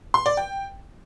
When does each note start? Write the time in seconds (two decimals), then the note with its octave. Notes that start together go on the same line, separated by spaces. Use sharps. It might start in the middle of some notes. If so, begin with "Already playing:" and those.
0.14 C6
0.26 D5
0.37 G5